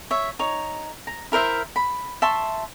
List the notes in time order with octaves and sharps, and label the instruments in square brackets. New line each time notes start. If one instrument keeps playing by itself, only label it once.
[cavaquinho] C#5 E5
D#4 C#5
A#5
E4 A#4 C5 E5
B5
E5 A5 C6 C#6